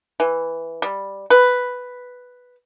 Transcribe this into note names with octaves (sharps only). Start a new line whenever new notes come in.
E3
G3
B4